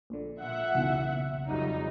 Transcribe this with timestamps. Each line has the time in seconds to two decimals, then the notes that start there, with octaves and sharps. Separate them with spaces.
0.10 A#1 D3
0.41 A#2 E5 F#5
0.74 B1 E2 C#3
1.48 F2 F#3 G3 D#4